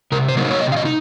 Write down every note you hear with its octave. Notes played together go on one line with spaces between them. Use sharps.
C3 A#4
C5
F#3 A#3 D#4
C#5
C3 D#5
F5
D#5
D#4